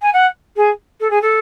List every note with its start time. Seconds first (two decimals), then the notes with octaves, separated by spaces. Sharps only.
0.02 G#5
0.13 F#5
0.56 G#4
1.00 A4
1.10 G#4
1.22 A4